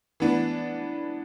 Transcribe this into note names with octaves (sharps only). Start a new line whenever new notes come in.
E3 B3 D4